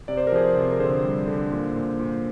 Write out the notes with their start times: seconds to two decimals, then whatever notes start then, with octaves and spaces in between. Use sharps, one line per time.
0.08 C3 D5
0.17 C5
0.27 A#4
0.32 F3 G#4 C5
0.57 C3
0.72 A#4
0.80 D3 G#4 C5
1.04 G3
1.28 D3
1.52 A#2
1.75 A#2
1.99 A#2